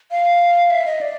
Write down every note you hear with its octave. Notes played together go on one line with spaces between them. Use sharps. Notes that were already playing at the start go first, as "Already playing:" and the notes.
F5
E5
D#5
D5